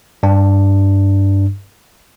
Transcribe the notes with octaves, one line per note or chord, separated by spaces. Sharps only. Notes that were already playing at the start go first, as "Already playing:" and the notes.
G2 D4